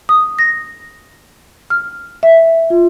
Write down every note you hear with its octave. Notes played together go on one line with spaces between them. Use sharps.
D#6
A#6
F6
E5
F4